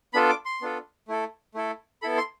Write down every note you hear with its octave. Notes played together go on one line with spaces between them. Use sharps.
B3 D4 F4 A4 B5
D6
C6
B3 D4 F4 A4
A3 E4 A4
A3 E4 A4
B3 E4 A4 B5
C6